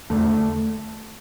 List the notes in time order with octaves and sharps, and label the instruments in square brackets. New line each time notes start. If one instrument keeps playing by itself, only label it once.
[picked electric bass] E2 D3 A3